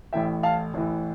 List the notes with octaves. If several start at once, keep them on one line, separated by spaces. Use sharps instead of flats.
A1 A2 E3 E5 G5
F5 A5
A1 A2 E3